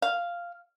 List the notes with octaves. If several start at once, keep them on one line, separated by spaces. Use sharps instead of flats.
F5